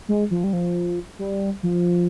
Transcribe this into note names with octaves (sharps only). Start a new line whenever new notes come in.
G#3
F3
G3
F3
G3
F3